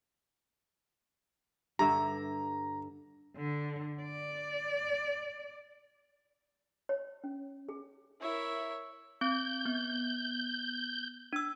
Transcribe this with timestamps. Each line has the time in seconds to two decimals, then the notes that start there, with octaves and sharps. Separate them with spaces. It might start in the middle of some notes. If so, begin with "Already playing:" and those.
1.79 G2 D3 E5 A#5
3.36 D3
4.02 D5
6.89 C#5
7.24 C#4
7.69 G#4
8.21 E4 A#4 C#5 E5
9.21 C4 G6
9.66 B3
11.33 D4 E6